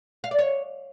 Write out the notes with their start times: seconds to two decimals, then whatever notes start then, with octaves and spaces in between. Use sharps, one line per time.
0.24 F5
0.31 D5
0.39 C#5